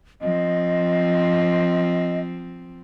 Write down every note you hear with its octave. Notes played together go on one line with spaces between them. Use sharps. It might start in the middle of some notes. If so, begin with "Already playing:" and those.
F3 C4 D#5